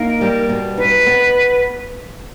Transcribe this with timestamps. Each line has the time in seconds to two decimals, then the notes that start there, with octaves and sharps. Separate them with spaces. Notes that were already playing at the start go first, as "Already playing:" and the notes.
Already playing: A#3 D#4 A#4
0.21 G3
0.49 B2
0.77 D#4 B4
1.06 B3